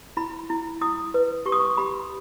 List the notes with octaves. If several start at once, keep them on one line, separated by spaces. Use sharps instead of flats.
E4 B5
E4
E4 D#6
B4
G4 C#6
D#6
C#6
G4 B5